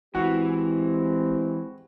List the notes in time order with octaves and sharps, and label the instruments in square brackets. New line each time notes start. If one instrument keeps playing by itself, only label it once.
[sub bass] A1 [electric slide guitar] E3 [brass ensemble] G#3 C4 G4 [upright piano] F#4